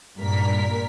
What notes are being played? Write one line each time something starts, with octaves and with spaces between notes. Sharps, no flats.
G2 A#2 A#4 B6